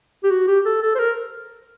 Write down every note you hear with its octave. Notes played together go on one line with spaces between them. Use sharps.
G4
F#4
G4
A4
A4
C5
A#4